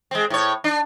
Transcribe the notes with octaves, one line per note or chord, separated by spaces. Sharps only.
G#3 C4
A2 C#5
D4